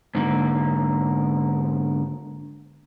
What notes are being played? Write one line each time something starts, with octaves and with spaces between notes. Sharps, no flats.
G#2 D3 A#3